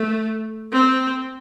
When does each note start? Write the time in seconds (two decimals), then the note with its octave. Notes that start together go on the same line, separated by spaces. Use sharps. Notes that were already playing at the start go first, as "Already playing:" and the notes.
Already playing: A3
0.73 C4